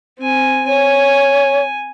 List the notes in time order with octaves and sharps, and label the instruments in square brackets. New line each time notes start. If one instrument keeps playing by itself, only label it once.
[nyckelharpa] C4 G#5
[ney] C#5 [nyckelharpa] G#5